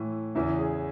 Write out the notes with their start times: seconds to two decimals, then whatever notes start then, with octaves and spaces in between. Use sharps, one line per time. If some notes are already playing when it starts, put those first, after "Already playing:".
Already playing: A2 E3
0.35 E2 C#3 E3 E4
0.58 G#4